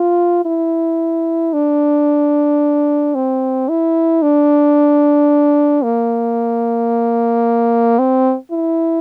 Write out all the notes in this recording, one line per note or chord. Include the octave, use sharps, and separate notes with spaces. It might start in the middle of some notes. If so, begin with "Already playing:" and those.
Already playing: F4
E4
D4
C4
E4
D4
A#3
C4
E4